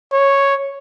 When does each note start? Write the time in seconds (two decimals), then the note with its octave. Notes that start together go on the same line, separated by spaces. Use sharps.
0.12 C#5